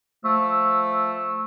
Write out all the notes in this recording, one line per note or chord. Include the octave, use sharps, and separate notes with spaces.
F3 A3 E6